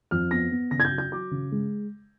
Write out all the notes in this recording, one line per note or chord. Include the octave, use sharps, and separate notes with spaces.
F2 F6
B3 A#6
B3
C#3 A#6
G#6
G6
F#3
G6
F#3 D6
C#3
G#3